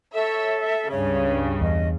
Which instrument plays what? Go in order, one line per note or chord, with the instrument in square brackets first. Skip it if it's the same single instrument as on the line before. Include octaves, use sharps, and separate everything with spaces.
[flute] A4 [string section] C#5 E5
[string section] E5
[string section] C#2 G2 C#3 [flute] C#5
[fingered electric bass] E2 [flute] D#5